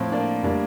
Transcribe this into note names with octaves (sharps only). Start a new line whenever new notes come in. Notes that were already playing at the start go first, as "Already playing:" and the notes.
Already playing: A2 F3 C4
A#3 D4
A2 G3 A#3 D4